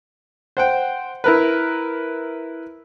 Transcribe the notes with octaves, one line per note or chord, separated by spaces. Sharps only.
C5 F#5 G5
E4 A#4 B4